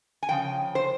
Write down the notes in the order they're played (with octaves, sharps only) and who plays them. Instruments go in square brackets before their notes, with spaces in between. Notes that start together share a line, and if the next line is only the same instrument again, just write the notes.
[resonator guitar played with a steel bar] G#5
C#3 F3 G5
C5